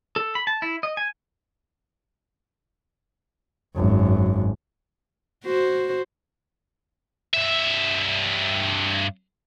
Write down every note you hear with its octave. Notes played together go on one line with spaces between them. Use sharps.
A4
B5
A5
E4
D#5
G#5
G#1 F#2
F#4 C5
G2 E5